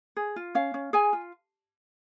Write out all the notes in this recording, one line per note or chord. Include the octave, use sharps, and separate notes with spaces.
G#4
F4
C#4 F5
C#4
G#4 G#5
F4